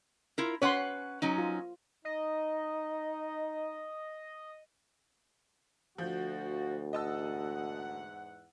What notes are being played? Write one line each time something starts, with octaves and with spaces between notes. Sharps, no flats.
E4 F4 A#4
C#4 B4 C#5 F#5 C6
F#3 C#4 D#4
F4
D#4 D#5
D2 F3 F#4 G6
E2 G#2 D#5 F#5 A5 E6